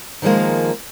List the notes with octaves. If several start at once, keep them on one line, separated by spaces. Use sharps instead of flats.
D#3 F3 F#3 G#3 A#3